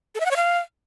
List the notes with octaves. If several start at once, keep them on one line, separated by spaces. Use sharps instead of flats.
A4
E5
F#5
C#5
F5